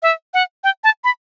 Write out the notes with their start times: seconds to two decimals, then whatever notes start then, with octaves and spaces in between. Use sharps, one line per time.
0.02 E5
0.34 F#5
0.64 G5
0.84 A5
1.04 B5